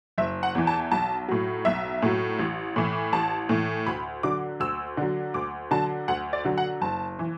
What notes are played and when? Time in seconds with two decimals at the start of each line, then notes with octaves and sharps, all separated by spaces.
0.18 F#1 E5
0.43 F#5
0.55 E2 E3
0.67 A5
0.92 B1 A5
1.28 A2 F#3
1.65 B1 E5
2.02 A2 F#3
2.39 A1
2.76 A2 E3
3.12 A1 A5
3.49 A2 E3
3.86 D2 B5
4.23 D3 F#3 D6
4.60 D2 E6
4.97 D3 F#3
5.34 D2 D6
5.71 D3 F#3 A5
6.08 D2 F#5
6.33 D5
6.45 D3 F#3
6.58 F#5
6.81 F#1 A5
7.19 E3